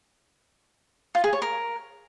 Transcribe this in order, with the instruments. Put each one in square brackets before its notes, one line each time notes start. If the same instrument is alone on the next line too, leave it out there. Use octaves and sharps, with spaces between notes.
[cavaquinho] F4
G#4
C#5
A#4